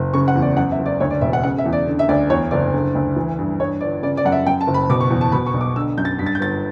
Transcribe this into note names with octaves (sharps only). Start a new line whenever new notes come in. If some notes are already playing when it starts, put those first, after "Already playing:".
Already playing: F#1
C#3 C#6
F#5
E2
D5
F#2 F#5
E5
F#1
D5
D2 C#5
D5
E1 E5
F#5
C#3 F#5
E5
E2
D5
D3
E5
D2 D5
E2 C#5
F#1 D5
D3
D2
E3
G2
G2 C#5
G1 D5
C#3 D5
D5
F#2 F#5
E5
F#2 G5
A5
F#1
B5
B2 D6
C#6
E2
A5
B2 B5
C#6
B1
D6
D3 E6
F#2 G6
A6
G2 B6
A6
G6
G1 A6